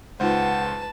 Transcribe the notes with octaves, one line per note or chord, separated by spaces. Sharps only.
C#2 G#3 D#4 F4 B4 C5 F#5 A5